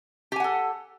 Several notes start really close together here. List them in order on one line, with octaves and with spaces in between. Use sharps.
G4 G#5 F#5 A4